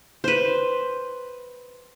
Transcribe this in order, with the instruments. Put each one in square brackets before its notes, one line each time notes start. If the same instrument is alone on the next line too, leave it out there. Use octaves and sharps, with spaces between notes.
[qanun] B4 C5